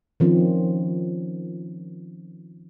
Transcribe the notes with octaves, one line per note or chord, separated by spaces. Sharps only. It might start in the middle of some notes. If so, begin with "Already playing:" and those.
D#3 F3 C4 C#4